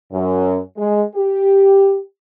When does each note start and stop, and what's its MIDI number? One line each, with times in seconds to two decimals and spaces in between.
0.11 0.58 42
0.76 1.02 56
1.14 1.99 67